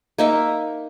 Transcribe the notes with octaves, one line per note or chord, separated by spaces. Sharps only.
A#3 D#4 E5